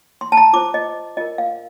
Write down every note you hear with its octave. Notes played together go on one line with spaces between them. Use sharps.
C6
A5
A#5
F4 C5 D6
D#5
F4 A#4 D#5
F5